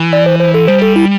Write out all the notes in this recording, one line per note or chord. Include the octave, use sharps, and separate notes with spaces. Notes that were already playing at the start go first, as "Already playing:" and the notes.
Already playing: E3
D5
C5
C5
A4
G3 C5
A4
E4